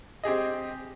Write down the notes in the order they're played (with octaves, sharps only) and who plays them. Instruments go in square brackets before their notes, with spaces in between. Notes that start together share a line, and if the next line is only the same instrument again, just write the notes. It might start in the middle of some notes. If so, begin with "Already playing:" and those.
[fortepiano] C4 G4 G#4 D#5